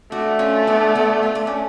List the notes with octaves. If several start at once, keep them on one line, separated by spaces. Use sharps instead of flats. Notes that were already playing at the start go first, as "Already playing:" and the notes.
A3 D4 F#4
C#4 F4
B3 D4
B3 D4
F4
D4
C#4